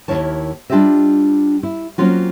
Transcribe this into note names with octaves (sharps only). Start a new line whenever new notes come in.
D#2 C#3 E4 A#4 C#5 A5
G3 D4 F4 G4 D#5 E5
E4
F#3 A#3 C4 C#4 F4 F#4